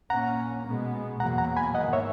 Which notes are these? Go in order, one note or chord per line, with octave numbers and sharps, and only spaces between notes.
A#2 A#3 C#4 F#5 A#5
B2 G#3 B3
E2 B2 F#3 A#3 F#5 A#5
F#5 A#5
G#5 B5
G#2 D#3 A#3 D#5 F#5
C#5 E5